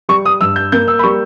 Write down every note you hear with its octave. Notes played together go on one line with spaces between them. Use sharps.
G3 C#6
D#6
G2 E6
G6
A#3 G6
E6
B5
G3 C#6